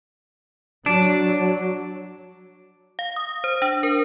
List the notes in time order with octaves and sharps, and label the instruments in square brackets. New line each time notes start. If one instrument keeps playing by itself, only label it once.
[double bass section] F#3 [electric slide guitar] D4
[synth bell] F5
D#6
C5
D4
A#4